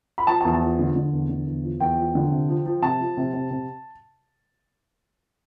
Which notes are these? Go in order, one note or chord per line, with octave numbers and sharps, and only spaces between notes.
B5
F3 A5
A5
E2
A5
F3
D3
D3
E2
D3
E2
F3
E2 G5
F3
D3
C3
F3
F3
C3 A5
F3
C3
C3
C3